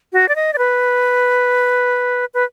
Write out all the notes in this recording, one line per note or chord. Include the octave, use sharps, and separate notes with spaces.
F#4
D5
D#5
D5
B4
B4